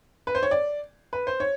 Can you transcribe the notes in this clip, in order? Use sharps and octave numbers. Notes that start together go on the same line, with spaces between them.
B4
C5
C#5
D5
B4
C5
C#5